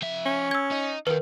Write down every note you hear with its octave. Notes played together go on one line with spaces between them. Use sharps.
F3 E5
C#4
E6 G#6
D#4
D#2 D#3 A#4 B4